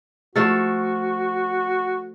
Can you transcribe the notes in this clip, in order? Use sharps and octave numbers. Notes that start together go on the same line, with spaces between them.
F3 A3 F#4 A4